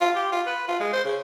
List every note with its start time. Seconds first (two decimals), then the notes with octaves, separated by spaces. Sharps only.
0.01 F4
0.16 G4
0.32 F4
0.46 B4
0.68 F4
0.80 G#3
0.93 C5
1.05 C#3